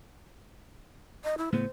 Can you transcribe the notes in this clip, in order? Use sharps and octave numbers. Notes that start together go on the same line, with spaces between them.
D#5
E4
A2 C#3 B3 C5